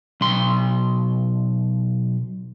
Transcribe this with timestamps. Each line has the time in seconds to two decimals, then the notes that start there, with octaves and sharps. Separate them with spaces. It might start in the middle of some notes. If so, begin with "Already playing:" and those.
0.21 B1 C6